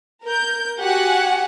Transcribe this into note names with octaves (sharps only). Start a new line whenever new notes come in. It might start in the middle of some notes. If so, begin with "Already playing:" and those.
A#4 G6
F#4 G4 F#5 G#5